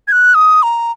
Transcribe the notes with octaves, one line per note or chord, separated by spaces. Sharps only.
G#6
F#6
D#6
A#5